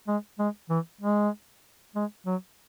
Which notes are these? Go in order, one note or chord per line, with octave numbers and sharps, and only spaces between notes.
G#3
G#3
E3
G#3
G#3
F#3